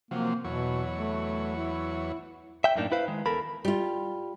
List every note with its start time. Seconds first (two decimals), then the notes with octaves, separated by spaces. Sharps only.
0.11 C3 F3 F#3 A#3
0.44 E2 B2 F#3 C#5
0.95 A3
1.56 E4
2.64 E5 G5
2.76 F#2 A2 A#3 D4 D#4
2.92 E4 B4 C5 F5
3.08 D#3 G#3
3.26 E2 A4 A#4 B5
3.65 G3 F4